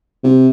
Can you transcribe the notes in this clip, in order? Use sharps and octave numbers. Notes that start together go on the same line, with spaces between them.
C3